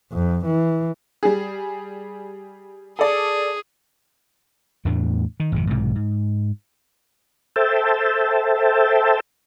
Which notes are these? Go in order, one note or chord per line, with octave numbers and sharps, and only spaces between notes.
F2
E3
G3 G#4
G#4 A4 D5
E2 A2 A3 D4
D#3
G#1 F2 C3
B1 G#2 C3 E3
G#2
A4 C5 E5 G5 A5